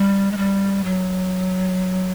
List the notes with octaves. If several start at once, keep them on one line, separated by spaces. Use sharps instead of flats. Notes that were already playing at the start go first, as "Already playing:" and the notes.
Already playing: G3
G#3
G3
F#3